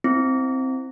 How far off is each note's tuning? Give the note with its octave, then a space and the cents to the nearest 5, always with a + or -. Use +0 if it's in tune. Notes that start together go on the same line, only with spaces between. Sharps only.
C4 +0 E4 +0